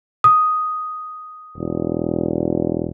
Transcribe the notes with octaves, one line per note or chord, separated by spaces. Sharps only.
D#6
E1